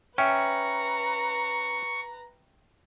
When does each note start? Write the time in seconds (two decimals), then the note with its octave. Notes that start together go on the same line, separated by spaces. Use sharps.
0.18 C#4 B4 E5 G5 A#5 C#6